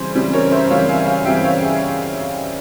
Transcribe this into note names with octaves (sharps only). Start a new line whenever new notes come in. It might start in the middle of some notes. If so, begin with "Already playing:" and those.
Already playing: C#3 E3 G3 C4 G#4 C5
C#3 E3 G3 C4
A#4 C#5
C5 E5
C#3 E3 G3 C4 C#5 F5
F5 G#5
F5 G#5
C#3 E3 G3 C4 E5 G5
C#5 F5
G#4